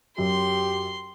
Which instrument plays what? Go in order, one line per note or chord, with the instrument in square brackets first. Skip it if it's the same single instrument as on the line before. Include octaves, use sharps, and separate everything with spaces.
[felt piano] F#2 [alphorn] G4 [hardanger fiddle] C6